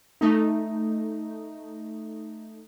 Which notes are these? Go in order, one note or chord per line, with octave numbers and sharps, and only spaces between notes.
A3 D#4